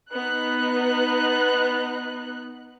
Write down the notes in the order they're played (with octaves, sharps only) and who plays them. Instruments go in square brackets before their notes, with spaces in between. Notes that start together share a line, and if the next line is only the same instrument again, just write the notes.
[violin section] B3 D#4 F#6